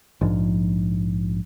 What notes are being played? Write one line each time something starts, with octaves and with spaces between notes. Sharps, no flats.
A#1 G#2 F3